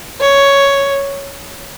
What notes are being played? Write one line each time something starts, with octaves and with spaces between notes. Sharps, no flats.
C#5